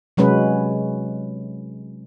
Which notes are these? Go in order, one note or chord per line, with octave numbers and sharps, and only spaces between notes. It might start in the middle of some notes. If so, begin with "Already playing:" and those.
C3 F#3 G#3 C#4 B4